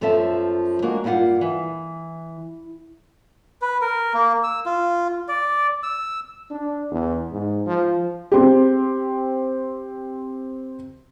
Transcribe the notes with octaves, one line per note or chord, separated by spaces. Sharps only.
F#2 F3 B3 A4 E5 A5
G#3 A#3 D4 F#4 A#4
G2 A#3 E4 F4 F#5
E3
B4
A#4
A#3
E6
F4
D5
E6
D4
E2
G#2
F3
C4 G4